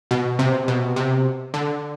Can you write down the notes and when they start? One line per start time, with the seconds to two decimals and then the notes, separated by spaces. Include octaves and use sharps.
0.11 B2
0.39 C3
0.68 B2
0.96 C3
1.54 D3